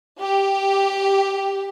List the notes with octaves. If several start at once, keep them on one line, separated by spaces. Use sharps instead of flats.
G4